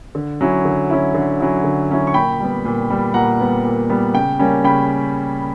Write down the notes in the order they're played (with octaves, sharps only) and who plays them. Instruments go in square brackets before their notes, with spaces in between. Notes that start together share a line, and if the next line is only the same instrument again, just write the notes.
[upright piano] D3
F#3 C#4 E4
D3
F#3 C#4 E4
D3
F#3 C#4 E4
D3
F#3 C#4 E4
C#6
A#2 G5 B5
G3 B3
A#2
G3 B3
A#2 F#5 A#5
G3 B3
A#2
G3 B3
C#3 G5
G3 A#3 C#4
C#3 G5 B5